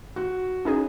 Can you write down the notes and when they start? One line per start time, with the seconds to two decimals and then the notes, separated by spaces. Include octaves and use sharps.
0.16 F#4
0.65 C#4 D#4 G#4